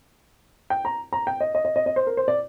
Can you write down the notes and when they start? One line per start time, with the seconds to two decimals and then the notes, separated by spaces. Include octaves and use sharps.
0.70 G5
0.85 A#5
1.13 A#5
1.27 G5
1.40 D#5
1.55 D#5
1.65 D#5
1.76 D#5
1.86 D#5
1.96 C5
2.07 A#4
2.17 C5
2.28 D5